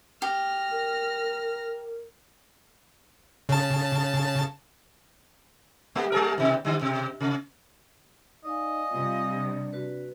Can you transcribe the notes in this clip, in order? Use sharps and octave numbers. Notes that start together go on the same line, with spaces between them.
G4 F6 A#6
A#4
C#3 A5
G3 A#3 G4
G3 G#4 A#4
B2 D#3
D3 G3
B2
C3
D#4 D5 D#5 F5 G#5
C3 G3 F4
D4
F#4 B4